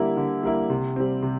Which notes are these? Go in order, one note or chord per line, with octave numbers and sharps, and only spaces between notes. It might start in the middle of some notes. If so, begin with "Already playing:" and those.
Already playing: D3 G3 A#3 E4
D3
G3 A#3 E4
C3
G3 C4
C3